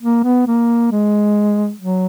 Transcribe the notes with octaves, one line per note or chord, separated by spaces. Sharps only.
A#3
B3
A#3
G#3
F#3